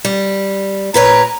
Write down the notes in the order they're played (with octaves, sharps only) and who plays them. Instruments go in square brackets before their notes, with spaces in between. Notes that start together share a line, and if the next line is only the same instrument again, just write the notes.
[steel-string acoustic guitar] G3
[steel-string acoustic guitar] A#2 B4 C#5 [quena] A#5